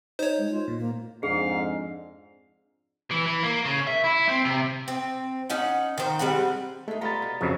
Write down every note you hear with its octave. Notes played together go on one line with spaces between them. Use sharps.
D#4 C5 C#5
G#3
F4
A#2
A#3
F2 G#2 D4 G#4 F5
E3
E3
A#3
C#3
E5
E4
C4
C3
C4
C#4 D#4 F#5
D#3 C5
G3 G#3 C4 F#5
G#3 A3 D#4
G3 B3 F4 A#5 B5 A6
B2
F2 C#3 F3 F#3 A3